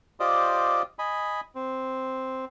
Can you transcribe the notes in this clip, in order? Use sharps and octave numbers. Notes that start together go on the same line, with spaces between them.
F4 G4 C5 D5 D#5
D#5 G#5 B5
C4